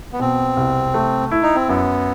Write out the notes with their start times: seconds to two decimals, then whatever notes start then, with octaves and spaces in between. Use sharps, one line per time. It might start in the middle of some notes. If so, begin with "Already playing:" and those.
0.13 B3
0.20 B2 C4
0.57 C2
0.94 A3
1.31 E4
1.43 D#4
1.55 C4
1.69 F#2 B3